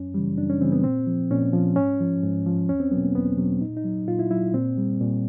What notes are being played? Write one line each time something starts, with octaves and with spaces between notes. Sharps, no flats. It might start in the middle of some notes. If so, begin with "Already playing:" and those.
Already playing: F#2 C#4
C#3 E3 G3
F#2 D4
C#4
C#3 E3 G3 C4
B3
A#2 C4
F3
A#2 C#4
F3
G#2 C#4
F3
G#2
F3
E2 C#4
C4
B2 F#3 B3
A#3
E2 B3
B2 F#3
A#2 D#4
D#4
F#3
A#2 F4
E4
F#3 E4
A#2 C4
G3
A#2